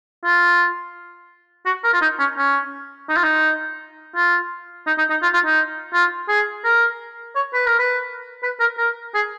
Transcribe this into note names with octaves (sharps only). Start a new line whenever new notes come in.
F4
F#4
A#4
F4
D#4
C#4
C#4
D#4
F4
D#4
F4
D#4
D#4
D#4
F4
F4
D#4
F4
G#4
A#4
C#5
B4
A#4
B4
B4
A#4
A#4
G#4